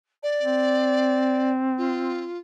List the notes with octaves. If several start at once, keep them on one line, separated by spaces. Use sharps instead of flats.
D5
C4
F4